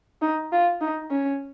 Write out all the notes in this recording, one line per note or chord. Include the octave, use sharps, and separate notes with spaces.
D#4
F4
D#4
C#4